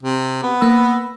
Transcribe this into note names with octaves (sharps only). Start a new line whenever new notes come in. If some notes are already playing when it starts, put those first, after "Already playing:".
C3
B3
A#3 B5 E6